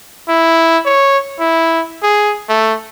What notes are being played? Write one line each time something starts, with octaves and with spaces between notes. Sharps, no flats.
E4
C#5
E4
G#4
A3